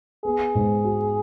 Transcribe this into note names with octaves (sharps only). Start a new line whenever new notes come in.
B3 G#4
G#2
F#4